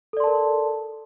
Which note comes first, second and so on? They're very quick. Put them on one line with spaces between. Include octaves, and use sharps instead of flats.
A4 D5 C6 A5 A#4